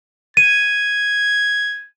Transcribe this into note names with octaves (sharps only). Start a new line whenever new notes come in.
G#6 D#7